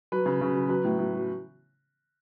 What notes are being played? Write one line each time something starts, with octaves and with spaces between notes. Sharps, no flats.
F#3 B4
C#3
C#3
F#3
F#3 B4
A2
A2
F#3